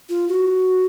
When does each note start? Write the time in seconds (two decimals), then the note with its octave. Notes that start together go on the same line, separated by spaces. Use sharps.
0.09 F4
0.28 F#4